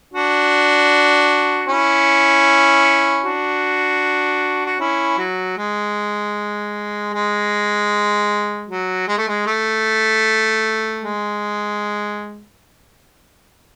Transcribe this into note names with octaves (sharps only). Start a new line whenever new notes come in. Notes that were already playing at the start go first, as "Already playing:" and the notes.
D4 F#4
C#4 E4
D4 F#4
F#4
C#4 E4
F#3
G#3
G#3
F#3
G#3
A3
G#3
A3
G#3